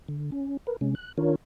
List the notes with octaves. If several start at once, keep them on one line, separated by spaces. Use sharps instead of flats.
D3
C#4
A#4 B4
C3 G#3 C#4
F#6
D#3 D4 F4 A#4 C#5